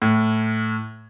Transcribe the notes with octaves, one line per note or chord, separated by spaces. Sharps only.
A2